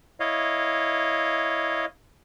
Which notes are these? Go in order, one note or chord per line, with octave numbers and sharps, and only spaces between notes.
E4 C#5 D#5 F5